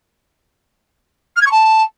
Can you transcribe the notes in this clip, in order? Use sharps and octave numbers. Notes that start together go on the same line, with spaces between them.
F6
G#6
C#6
A5